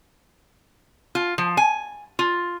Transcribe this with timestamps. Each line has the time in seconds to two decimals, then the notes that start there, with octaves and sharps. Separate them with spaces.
1.15 F4
1.38 F3
1.57 G#5
2.19 F4